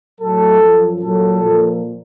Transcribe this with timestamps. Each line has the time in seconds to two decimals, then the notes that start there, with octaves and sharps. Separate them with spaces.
0.21 A2 F#3 A4
0.61 F#2 F3
1.02 A#2 F#3 A4
1.43 A#2 F3